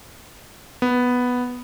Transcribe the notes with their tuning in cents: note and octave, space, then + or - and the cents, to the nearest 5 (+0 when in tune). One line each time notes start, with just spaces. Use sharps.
B3 +0